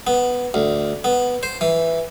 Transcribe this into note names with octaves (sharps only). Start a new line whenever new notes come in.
B3
D2
B3
C5
E3